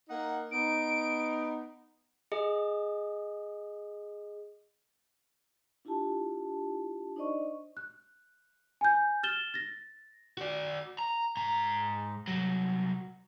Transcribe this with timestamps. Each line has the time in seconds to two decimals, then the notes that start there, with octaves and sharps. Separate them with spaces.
0.09 A#3 D#4 F#5
0.52 B3 D#4 D7
2.32 G#4 D#5
5.85 D4 E4 F4 G4 A5
7.16 D4 D#4 C5 D5 D#5 C#6
7.77 F#6
8.81 G#5 G6
9.23 F6 A6 E7 G7
9.54 A6 A#6
10.38 F#4 D5
10.99 A#5
11.37 G#2 A#5
12.28 C2 F#3